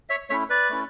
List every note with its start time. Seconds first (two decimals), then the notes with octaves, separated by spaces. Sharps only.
0.09 C#5 E5
0.30 A3 C#4 E4 C#5 E5
0.49 B4 D5
0.70 A3 C#4 E4